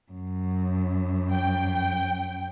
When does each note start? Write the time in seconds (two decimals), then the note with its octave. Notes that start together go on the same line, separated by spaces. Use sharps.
0.12 F#2
1.33 G5